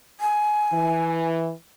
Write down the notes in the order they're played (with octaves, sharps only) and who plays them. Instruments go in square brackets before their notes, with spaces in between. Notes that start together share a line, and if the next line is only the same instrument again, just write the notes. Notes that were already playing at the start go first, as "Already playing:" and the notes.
[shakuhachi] G#5
[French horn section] E3